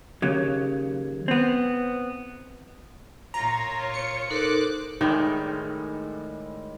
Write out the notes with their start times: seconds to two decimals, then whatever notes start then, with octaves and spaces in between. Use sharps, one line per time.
0.22 D#2 C#3 F#3
1.28 B3 C4
3.34 A#2 F4 C#5 A#5
3.94 C#7
4.30 D#4 A4 A#4 C5 D6 F#6
5.01 A2 D#3 G3 G#3